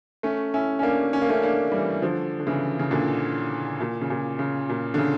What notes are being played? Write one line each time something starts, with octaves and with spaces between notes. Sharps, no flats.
A3 C#4
C#4 E4
C#4
A#3 D4
C#4
A#3
A3 C#4
A#3 D4
E3 G3
D3 F3
D3
C#3 E3
C#3
A#2 D3
A#2
C#3
A#2
C#3
A#2
D3
C#3